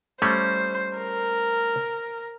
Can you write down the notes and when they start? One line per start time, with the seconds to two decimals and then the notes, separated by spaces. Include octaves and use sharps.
0.22 G3 A3 C#4 C5
0.97 A#4